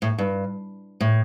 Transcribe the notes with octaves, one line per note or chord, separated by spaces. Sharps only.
A2
G2
A2